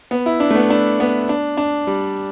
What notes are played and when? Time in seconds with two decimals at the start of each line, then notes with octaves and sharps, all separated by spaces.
0.11 B3
0.26 E4
0.40 D4
0.50 A3
0.55 B3
0.70 D4
1.00 B3
1.29 D4
1.57 D4
1.87 G3